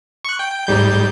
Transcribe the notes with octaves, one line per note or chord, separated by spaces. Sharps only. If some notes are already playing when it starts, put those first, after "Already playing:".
C#6 F#6
G5
G#2 G3 G6